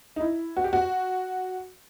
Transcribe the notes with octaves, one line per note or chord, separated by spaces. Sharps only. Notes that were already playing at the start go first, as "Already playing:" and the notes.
D#4
E4
F#4
G4
F#4